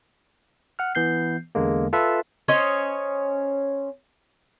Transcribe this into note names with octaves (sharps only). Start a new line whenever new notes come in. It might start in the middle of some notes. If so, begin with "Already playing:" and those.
F#5 F6
E3 B3 G6 C7
E2 D3 G#3 A#3
F4 A4 B4 E5
C#4 C5 C#5 D#5